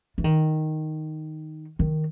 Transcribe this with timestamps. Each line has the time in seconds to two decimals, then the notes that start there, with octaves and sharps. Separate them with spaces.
0.18 E3
0.24 D#3
1.79 D#3